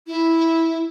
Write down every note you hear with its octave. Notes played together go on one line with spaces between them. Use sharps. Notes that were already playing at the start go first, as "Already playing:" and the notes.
E4